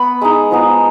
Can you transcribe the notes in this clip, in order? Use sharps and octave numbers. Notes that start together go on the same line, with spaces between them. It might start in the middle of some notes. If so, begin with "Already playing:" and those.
Already playing: B3 B5
G#3 D#4 A#5
F3 G#3 B3 D#4